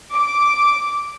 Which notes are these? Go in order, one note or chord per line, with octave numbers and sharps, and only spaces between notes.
D6